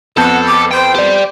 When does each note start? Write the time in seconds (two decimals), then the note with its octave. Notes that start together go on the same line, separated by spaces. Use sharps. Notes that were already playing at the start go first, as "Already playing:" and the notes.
0.17 F2 B3 A4 F#5 A5 G6
0.46 D6
0.71 C5 G5
0.95 G4 D5